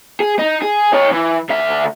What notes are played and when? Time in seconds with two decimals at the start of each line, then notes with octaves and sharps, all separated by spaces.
0.20 G#4
0.39 D#4
0.62 G#4
0.94 D#4 C#5
1.12 E3
1.50 D2 E5